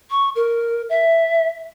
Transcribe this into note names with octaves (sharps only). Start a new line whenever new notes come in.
C#6
A#4
E5